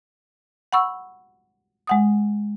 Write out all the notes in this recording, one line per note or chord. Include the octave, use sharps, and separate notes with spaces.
F#5 B5 C#6 E6
G#3 F#5 D#6